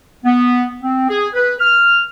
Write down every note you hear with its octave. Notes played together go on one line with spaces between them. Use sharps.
B3
C4
G#4
B4
F6